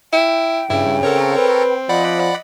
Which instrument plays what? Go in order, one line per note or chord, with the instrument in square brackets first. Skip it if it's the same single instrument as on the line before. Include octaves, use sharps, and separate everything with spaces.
[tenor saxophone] E4 [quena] G5
[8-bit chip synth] G2 [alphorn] C#3 [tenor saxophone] E4
[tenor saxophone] C4 [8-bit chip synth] A4 A#4 C#5
[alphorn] B4
[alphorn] F3 [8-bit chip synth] D5 F#5 B5 [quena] D#5